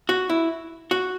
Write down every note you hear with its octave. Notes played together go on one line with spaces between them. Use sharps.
F#4
E4
F#4